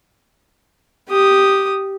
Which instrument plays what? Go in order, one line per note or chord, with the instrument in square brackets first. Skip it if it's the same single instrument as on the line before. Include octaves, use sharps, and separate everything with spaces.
[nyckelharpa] G4 D#6